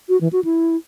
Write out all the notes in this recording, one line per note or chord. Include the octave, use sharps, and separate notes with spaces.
F#4
E3
F#4
E4